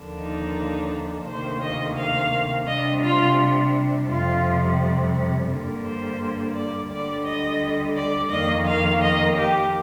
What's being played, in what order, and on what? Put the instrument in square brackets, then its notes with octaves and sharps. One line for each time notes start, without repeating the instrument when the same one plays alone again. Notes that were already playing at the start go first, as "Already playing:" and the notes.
Already playing: [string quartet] D#2 D3 F3 A#3 D4
D#4
D2 C3 D#3 A#3 C5
D#5
F5
C3 G3 D4 D#5
F4
F2 C3 G3 F4
G2 D3 G3 A#3
C5
D5
D2 D3 G3 D5
D#5
D5
F2 D#3 A#3 D#5
F5
D#5
G4